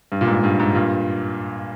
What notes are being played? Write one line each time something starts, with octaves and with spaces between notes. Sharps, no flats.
G2
A#2
G#2
G2
G#2
G2 A#2